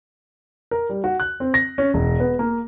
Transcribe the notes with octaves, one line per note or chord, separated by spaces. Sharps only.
A#4
G3
F#4
F#6
C4
A#6
C#4
E1
B3
A#3